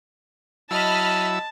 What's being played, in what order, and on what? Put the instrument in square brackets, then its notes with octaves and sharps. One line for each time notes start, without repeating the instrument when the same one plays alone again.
[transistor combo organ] F#3 E4 E6 [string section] D#5 B5 F6 [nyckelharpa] A5